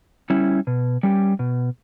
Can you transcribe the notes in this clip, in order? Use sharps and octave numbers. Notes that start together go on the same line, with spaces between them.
G3 C#4 E4
B2
G3 C#4 G4
B2